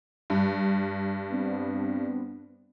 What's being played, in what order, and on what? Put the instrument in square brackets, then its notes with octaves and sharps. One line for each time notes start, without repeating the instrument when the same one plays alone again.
[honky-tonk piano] G2
[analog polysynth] B3 C4 D4